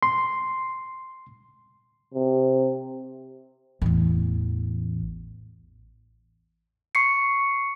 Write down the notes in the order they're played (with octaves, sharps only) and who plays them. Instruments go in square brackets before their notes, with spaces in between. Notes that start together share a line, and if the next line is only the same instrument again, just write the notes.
[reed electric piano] C6
[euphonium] C3
[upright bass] A1 E2
[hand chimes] C#6 C7 C#7